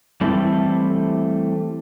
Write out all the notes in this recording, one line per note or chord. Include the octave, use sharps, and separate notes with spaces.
E3 G3 A3 C4 E4 A4